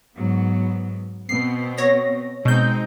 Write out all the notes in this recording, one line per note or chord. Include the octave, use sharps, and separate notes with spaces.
G#2 F#3 B3
B2 B3 C4 C7
C#5 A#6
B2 G#3 C4 D#4 G6